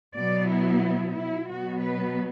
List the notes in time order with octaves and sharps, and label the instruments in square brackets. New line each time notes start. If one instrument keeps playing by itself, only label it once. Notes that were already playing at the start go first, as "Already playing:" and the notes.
[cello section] B2 F#3 B3 D5
E4
E4
B2 F#3 B3 F#4
B4